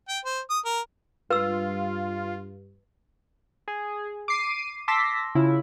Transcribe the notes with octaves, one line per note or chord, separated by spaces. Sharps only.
G5
C5
D#6
A#4
G2 F4 B4 E6
G#4
D6 C7 D#7
A5 C6 D6 E6 A#6 B6
C#3 E4 F4